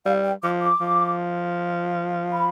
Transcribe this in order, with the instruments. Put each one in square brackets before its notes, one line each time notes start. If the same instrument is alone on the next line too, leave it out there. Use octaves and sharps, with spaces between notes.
[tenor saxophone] G3 [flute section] F5
[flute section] G5
[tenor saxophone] F3 [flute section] D6
[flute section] D6
[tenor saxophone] F3
[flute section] B5